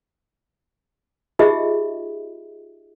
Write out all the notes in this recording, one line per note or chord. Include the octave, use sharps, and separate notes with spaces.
D#4 F4 G4 G#4 D#5 E5